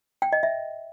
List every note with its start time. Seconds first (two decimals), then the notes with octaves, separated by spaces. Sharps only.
0.22 G5
0.33 D#5
0.43 E5